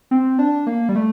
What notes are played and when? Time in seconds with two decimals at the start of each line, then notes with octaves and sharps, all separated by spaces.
0.11 C4
0.39 D4
0.67 A#3
0.89 G3
0.96 A3